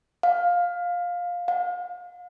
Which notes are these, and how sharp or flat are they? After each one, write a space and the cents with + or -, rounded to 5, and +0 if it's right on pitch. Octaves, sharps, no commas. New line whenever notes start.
F5 +15
F5 +40